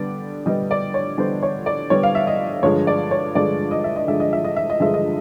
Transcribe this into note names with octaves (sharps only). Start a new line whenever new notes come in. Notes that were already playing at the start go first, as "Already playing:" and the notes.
Already playing: D3 G3 B3 D5
D3 G3 B3 D#5
D5
C#5
D3 G3 B3 C5
C#5
D5
D3 G3 B3 C#5
F5
E5
D#5
G2 D3 F3 G#3 C#5
D5
C#5
G2 D3 F3 G#3 D5
D#5
E5
D#5
G2 D3 F3 G#3 E5
D#5
E5
D#5
E5
D#5
G2 D3 F3 G#3 E5
D#5